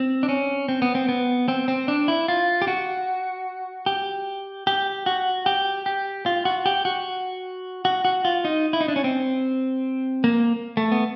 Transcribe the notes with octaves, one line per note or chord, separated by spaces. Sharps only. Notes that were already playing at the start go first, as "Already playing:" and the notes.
Already playing: C4
D4
C#4
C4
B3
C4
B3
C4
C4
D4
E4
F4
G4
F#4
G4
G4
F#4
G4
G4
F4
F#4
G4
F#4
F#4
F#4
F4
D#4
E4
D#4
D4
C#4
C4
A#3
A3
B3